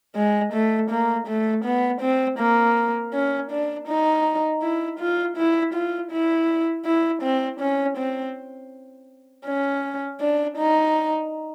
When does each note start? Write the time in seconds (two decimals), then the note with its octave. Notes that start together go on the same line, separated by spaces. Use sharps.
0.15 G#3
0.53 A3
0.90 A#3
1.27 A3
1.64 B3
2.01 C4
2.39 A#3
3.13 C#4
3.51 D4
3.88 D#4
4.62 E4
4.99 F4
5.37 E4
5.73 F4
6.11 E4
6.85 E4
7.22 C4
7.60 C#4
7.97 C4
9.46 C#4
10.21 D4
10.58 D#4